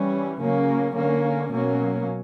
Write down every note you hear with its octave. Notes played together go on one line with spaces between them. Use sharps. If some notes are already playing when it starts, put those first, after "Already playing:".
Already playing: E3 G3 C#4
C#3 F#3 A#3 C#4
D3 A#3 C#4
B2 F#3 A#3 C#4